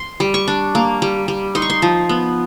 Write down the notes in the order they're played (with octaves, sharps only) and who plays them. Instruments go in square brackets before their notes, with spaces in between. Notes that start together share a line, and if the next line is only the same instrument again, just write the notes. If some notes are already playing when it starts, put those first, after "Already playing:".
Already playing: [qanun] C6
G3
C#6
D4
A#3
G3
G3
D#4 C6
C#6
C6
F3
B3